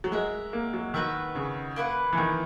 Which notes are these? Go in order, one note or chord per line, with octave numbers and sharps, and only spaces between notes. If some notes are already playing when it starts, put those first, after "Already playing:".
F#3
G#3 F#4 A#4 E5
A#3
F#3
D#3 F#4 B4 E5
C#3
A#3 E4 B4 F#5
E3
D#3